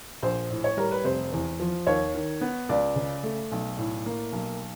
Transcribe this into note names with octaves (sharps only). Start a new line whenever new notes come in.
A#1 C5
A2
C#5
G3 A#4
B4
F1 C5
E2
F3
D#2 C#5
D#3
B3
C#2 D5
C#3
A3
B1
A2
A#3
B1